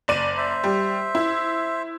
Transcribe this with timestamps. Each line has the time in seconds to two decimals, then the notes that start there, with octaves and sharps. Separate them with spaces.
0.08 F#1 D5 D#7
0.37 C5 E5
0.64 G3
1.15 E4